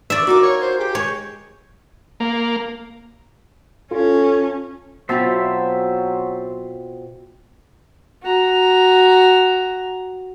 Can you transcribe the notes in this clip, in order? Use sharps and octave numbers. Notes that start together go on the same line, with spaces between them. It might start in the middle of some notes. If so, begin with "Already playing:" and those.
E3 D5 E5
D#4 F4 F#4 A#4 D6
C#5
C5
G4 G#4
G#3 C#5
A#3
C#4 F4 A4
B2 F#3 C4 F4 C5 E5 A5
F#4 A#5